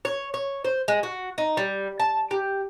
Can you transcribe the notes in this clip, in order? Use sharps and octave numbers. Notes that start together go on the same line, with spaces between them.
C#5
C#5
C5
G#3
F#4
D#4
G3
A5
G4